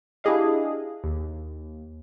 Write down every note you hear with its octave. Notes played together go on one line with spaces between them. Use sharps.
D4 E4 G4 G#4 D#5 F5
D#2